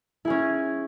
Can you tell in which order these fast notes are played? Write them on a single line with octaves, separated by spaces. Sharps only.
E4 G#4 C#4